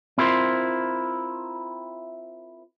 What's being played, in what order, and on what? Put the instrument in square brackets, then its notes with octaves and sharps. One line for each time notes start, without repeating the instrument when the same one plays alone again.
[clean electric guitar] C4 E4 F4 A#4 C5